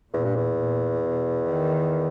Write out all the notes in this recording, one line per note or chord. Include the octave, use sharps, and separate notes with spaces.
E2 A#2
G2
E2
A#2
B2
D#3